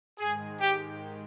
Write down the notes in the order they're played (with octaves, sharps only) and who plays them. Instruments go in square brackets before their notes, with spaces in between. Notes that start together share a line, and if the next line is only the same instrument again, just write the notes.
[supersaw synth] G#2 D#3 G#3 [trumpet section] G#4
[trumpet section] G4